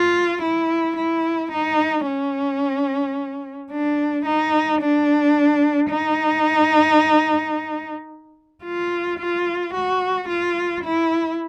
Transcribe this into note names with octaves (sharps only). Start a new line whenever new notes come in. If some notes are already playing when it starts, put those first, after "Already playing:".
Already playing: F4
E4
E4
D#4
C#4
D4
D#4
D4
D#4
F4
F4
F#4
F4
E4